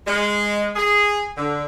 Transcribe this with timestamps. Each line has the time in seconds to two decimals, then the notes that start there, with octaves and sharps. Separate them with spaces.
0.07 G#3
0.76 G#4
1.36 D3